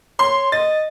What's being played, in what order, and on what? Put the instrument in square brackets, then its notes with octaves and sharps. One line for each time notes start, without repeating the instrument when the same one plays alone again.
[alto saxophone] C#5 [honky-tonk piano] C6
[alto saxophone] D#5 [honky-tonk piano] A6